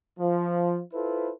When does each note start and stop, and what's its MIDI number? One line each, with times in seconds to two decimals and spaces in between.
0.20 0.80 53
0.93 1.29 64
0.93 1.29 65
0.93 1.29 69
0.93 1.29 71
0.93 1.29 72